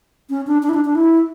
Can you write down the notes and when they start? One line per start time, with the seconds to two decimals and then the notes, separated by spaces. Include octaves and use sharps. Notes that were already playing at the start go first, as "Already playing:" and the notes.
0.30 C#4
0.47 D4
0.63 D4
0.69 E4
0.74 D4
0.85 D4
0.95 E4